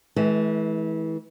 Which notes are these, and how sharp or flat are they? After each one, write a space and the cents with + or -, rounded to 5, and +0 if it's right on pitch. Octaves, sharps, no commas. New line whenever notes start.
E3 -25 G#3 +45